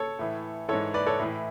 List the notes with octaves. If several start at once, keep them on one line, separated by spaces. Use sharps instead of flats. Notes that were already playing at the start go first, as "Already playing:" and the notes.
Already playing: A4 C#5
A2 E3
G#2 E3 A4 C#5
B4 D5
A4 C#5
A2 E3